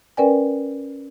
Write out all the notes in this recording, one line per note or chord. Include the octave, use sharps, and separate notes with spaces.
C#4 A#4 B4 D5 G5 G#5